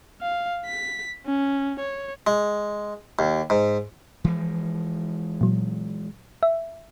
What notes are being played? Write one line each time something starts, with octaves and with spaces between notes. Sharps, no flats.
F5
B6
C#4
C#5
G#3
D#2
G#2
E3 F3 G#3
A#2 F#3
E5